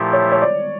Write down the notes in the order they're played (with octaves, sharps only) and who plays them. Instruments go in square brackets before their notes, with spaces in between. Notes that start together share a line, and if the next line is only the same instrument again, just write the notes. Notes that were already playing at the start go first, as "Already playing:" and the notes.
Already playing: [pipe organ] A#2 F3 A3 E4 G4
[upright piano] C#5
C#5
D5